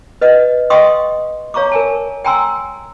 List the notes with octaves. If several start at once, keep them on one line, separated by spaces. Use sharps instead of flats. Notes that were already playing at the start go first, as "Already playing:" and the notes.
B4 D#5 F#5
D#5 F5 G5 C6 C#6 D#6
C#5 F5 A#5 C#6 D6
A#4 G#5 A5
G5 G#5 A#5 C6 E6